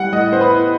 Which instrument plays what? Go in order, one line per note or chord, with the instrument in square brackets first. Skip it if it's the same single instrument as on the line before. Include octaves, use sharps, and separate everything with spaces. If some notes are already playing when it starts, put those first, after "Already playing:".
Already playing: [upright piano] G3 B3 E4 F#5
A2 D#5
B3 C5
B4
E4